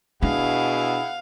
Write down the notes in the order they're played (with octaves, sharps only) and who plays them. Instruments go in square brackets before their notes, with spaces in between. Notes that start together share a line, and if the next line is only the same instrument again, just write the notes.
[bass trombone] B2 [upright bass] D4 [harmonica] E4 G#4 F#5 [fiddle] F5